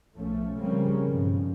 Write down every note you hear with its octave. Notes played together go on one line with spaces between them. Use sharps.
B1 F3 A3 C#4
C#3 F3 G3 A#3 C4 C#4
B1 G2 F3